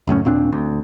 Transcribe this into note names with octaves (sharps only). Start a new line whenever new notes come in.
C#2 F#2 A2 C#4
D#2 A#2 C4 D4
D2